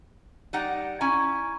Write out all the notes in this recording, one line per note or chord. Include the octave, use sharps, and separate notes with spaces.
G3 D#4 F#5
C#4 E4 G#5 A#5 C#6 G#6